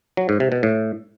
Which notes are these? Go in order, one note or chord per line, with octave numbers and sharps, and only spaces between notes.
F#3
G#2
C3
B2
A2